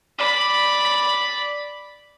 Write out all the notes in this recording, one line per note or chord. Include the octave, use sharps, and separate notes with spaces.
D5 B5